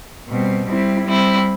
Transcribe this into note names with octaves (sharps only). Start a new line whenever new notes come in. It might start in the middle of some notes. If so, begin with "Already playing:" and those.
B2 G3 C4
G3 C4 E4
G3 C4 E4